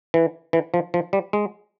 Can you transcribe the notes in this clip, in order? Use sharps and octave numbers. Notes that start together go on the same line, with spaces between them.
E3
E3
F3
F3
G3
G#3